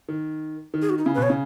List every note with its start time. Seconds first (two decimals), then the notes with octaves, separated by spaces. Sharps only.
0.09 D#3
0.74 D#3
0.82 G#4
0.90 F#4
0.98 D#4
1.06 C#3 E4
1.15 B4
1.18 B2
1.23 C#5
1.30 C#3